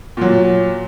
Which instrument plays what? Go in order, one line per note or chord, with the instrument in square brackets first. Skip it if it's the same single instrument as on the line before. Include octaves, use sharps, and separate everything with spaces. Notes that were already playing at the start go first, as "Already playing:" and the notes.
[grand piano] A#2 F#3